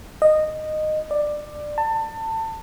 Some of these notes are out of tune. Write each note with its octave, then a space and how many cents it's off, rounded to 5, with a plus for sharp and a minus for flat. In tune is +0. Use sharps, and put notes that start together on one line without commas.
D#5 -15
D5 +15
A5 +25